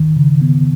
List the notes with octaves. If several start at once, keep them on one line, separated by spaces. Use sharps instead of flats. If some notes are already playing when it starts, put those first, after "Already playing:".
Already playing: D#3
C#3
B3